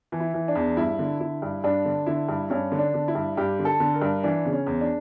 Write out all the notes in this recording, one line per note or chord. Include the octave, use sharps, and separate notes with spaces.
E3
E4
E3
D4
E2
G2 E4
D3
D3 E4
G2
G2 D4
D3
D3 E4
G2
G2 C#4
D3
D4
D3
E4
G2
G2 G4
D3
A4
D3
A#4
G2
E3 D4
C#3
C#4
E2
D4